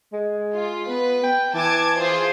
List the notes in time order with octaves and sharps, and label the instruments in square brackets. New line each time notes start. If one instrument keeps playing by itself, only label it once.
[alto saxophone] G#3
[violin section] F4
[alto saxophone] B3 [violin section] B4
[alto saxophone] G5
[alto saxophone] E3 [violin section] A5 D6 G#6
[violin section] F4 G#4 C5